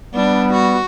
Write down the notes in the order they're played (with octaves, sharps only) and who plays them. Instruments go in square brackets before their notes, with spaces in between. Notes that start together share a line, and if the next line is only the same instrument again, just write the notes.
[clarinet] G3 [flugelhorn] B3 [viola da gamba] D4
[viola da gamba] F#4